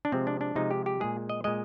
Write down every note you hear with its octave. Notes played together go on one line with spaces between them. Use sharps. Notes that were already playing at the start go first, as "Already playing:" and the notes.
D4
C3 F3 G#3 C4
D4
D4
C3 F3 G#3 D#4
G4
G4
A#2 G#3 G#4
D#5
A#2 G#3 D#5